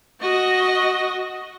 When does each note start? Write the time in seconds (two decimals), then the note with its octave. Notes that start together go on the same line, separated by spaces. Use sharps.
0.21 F#4 D#5